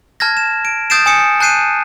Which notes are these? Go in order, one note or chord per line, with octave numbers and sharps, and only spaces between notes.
A5 F6 G#6 A#6
E7
D7
D#6 G6 A6 C7 D7 E7
G#5 D#6 C#7
A5 F#6 G6 C7 D#7